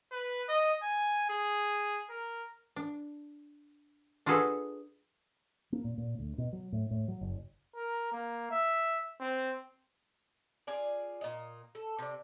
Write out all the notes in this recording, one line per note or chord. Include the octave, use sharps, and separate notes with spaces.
B4
D#5
G#5
G#4
A#4
D4
D4 F4 F#4 G#4 A4 B4
A#3
A#2
A#2
D2
B2
F#3
A2
A2
F#3
F#1
A#4
A#3
E5
C4
F4 G#4 D5
A#2 D#5
A4
C3 D5